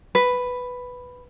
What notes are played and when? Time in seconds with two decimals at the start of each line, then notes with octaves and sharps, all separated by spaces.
0.15 B4